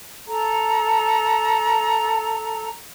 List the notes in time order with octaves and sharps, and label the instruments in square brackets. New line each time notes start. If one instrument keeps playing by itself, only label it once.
[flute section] A4 A#5